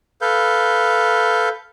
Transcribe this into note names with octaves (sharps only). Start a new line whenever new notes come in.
A4 B4 F5 G6